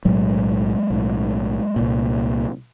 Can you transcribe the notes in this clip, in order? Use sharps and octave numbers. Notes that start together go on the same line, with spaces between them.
B1 A2 F#3 G#3
B1 A2
C2 A#2